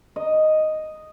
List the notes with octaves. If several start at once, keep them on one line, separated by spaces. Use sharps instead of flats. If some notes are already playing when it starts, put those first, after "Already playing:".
D#5